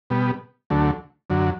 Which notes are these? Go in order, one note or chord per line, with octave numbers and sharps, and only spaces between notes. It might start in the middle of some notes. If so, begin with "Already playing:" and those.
B2 G3 B3
D2 D3 F#3 A3
F#2 D3 F#3